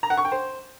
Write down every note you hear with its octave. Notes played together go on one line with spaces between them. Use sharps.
A#5
F#5
C#6
G5
C5